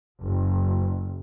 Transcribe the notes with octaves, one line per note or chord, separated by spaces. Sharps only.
F#1